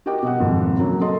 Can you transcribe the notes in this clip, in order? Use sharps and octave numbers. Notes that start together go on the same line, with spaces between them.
F#4 G4 A#4 D#5 G5 D6
B2 D#5 F#5
G#1 F2 B2
C#3 F#3 A#3
A4 D#5 C6